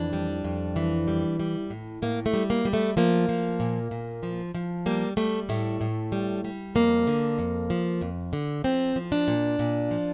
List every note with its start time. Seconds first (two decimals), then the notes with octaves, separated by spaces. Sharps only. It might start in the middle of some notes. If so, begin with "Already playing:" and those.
Already playing: F2 E3 D4
0.13 G3
0.44 F2
0.76 E3
1.07 G3
1.40 G3
1.70 A2
2.02 A2 A#3
2.26 A3
2.33 G3
2.50 A#3
2.65 G3
2.73 A3
2.97 F3 A#3
3.29 F3
3.60 A#2
3.91 A#2
4.23 F3
4.55 F3
4.86 G3 A#3
5.17 G3 A3
5.49 A2 A3
5.81 A2
6.12 G3
6.44 G3
6.75 F2 A#3
7.07 D3
7.39 F2
7.70 F3
8.01 F2
8.33 D3
8.64 F3 C4
8.96 F3
9.12 D4
9.28 A#2
9.59 A#2
9.91 F3